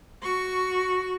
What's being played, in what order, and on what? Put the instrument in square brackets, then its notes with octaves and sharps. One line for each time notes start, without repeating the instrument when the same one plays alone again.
[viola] F#4 C#6